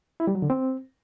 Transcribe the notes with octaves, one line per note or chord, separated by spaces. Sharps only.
E4
G3
F#3
D3
C4